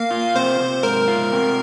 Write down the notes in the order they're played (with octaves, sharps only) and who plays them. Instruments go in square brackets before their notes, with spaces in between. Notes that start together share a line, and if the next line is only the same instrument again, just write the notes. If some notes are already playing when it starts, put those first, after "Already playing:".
Already playing: [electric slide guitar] A#3 [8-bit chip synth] F5
[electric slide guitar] F4
[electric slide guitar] C3 [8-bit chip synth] C5
[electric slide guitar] C3
[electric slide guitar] G#2 [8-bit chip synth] A#4
[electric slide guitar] F4
C3